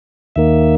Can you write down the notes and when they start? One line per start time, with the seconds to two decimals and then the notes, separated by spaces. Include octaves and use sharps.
0.36 D#2 D#3 A#3 E5